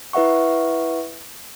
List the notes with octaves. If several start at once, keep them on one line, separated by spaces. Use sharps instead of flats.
E4 B4 E5 F#5 C#6